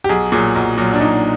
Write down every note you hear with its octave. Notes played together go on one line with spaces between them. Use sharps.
G4
B1 G#4
A#2 F#3 G#4
B1
A#2 F#3
D4
B1 D#4